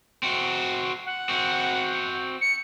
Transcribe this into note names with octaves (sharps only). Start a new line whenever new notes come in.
C4 F#4
F#5
C4 F#4
C#7